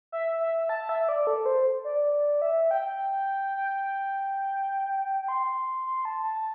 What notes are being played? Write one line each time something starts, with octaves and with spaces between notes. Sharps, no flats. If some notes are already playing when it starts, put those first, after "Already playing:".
E5
E5
A5
E5
D5
A4
C5
D5
E5
G5
G5
C6
C6
A5
A5